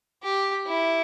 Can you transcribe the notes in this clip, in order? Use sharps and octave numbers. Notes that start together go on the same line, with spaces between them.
G4
E4